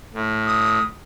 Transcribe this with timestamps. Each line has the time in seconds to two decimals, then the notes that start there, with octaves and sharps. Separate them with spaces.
0.14 A2
0.46 D#6